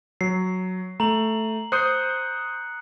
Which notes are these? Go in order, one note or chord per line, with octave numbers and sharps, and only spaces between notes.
F#3 C7
A3 A#5 F#7
C5 D#6 F#6 G6 C7 C#7